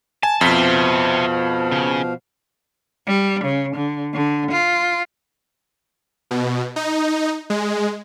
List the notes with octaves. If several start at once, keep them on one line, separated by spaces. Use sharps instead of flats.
G#5 A5
F2 B2 F3 C5 E5 F5 B6
C#3
G3
C#3
D3
D3
F4
B2
D#4
G#3